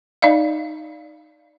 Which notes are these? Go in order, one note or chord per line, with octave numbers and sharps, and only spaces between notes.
D#4 D5 D#5 F5